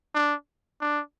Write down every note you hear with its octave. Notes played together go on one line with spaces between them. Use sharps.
D4
D4